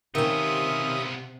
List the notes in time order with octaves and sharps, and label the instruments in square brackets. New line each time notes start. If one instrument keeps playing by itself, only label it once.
[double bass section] C3 [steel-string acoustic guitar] D#3 C#4 [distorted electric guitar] B3 F4 [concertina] E5 D#6